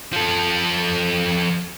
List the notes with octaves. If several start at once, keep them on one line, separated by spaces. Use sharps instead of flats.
F3 A4